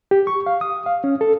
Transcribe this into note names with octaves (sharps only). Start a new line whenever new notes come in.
G4
C#6
F5
D#6
F5
C#4
A4